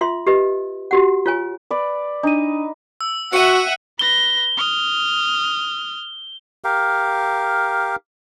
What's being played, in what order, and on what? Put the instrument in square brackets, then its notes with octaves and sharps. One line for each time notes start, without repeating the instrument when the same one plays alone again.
[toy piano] F4 E5 C6
G4 B4 D#5
F#4 G4 F#5
F4 C#5 G#5
[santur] B4 D5
[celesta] D4 D#7 [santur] D#4
[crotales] E6
[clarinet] F#4 [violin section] E5 F#5 [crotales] C#7 D#7
[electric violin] B4 A#6 [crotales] G7
[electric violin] D#6 F6
[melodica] G4 A#4 F5